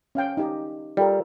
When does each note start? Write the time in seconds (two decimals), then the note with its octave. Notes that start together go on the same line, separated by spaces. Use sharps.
0.15 C#4 F5 G5
0.37 D#4 G4 D#5
0.97 G3 F4 A4 A#4